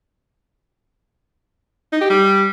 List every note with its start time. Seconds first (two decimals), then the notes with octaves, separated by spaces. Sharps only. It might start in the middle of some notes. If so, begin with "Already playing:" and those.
1.93 D#4
2.01 G4
2.10 G3